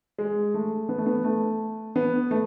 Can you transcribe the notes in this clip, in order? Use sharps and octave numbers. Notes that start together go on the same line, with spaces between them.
G#3
A3
B3
A3
B3
A3
B3
A3